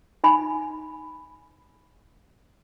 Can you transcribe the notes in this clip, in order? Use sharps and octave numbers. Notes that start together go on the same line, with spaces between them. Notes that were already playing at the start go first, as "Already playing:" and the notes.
D#4 G#5 B5